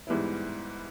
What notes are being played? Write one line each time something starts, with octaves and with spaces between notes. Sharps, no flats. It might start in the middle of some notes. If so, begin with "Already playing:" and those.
G#2 E3 G3 B3 E4